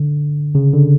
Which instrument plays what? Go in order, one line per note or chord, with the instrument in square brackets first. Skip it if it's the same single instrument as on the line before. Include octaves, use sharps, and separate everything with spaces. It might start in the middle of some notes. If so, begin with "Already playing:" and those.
Already playing: [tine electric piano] D3
C#3
D3